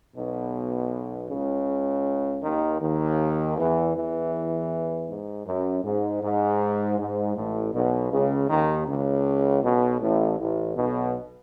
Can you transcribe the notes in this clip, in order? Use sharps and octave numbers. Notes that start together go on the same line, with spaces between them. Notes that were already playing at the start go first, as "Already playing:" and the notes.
B1 B2
C#2 C#3
D#2 D#3
D#2 D#3
E2 E3
E2 E3
G#2
F#2
G#2
G#2
G#2
A1 A2
B1 B2
C#2 C#3
D#2 D#3
C#2 C#3
B1 B2
A1 A2
A1 A2
B1 B2